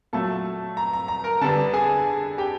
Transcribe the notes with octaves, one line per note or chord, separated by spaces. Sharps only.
A#2 F#3 A3 A4 A5
A#5
A#5
A#5
A#4 A#5
D3 G3 B3 D4 A4 A5
G#4 G#5
G4 G5